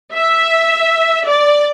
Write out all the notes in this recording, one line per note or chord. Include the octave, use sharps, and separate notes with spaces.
E5
D5